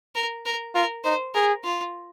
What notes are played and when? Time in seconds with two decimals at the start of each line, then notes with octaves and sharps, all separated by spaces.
0.16 A#4
0.46 A#4
0.75 F4 A#4
1.04 D#4 C5
1.35 G#4 A#4
1.64 F4